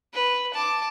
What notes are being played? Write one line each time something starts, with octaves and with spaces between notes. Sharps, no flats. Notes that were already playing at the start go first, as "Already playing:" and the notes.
B4
A5 D6